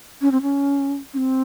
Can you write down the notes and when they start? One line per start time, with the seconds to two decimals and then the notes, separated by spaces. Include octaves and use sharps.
0.22 C#4
0.32 C4
0.42 C#4
1.14 C#4
1.17 C4